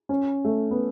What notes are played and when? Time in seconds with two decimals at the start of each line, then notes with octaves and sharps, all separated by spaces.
0.09 C#4
0.45 A3
0.71 B3